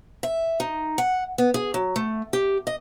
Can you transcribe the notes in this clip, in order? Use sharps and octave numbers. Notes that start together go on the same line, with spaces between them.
E5
D#4
F#5
B3
G#4
F#3
A3
G4
D#5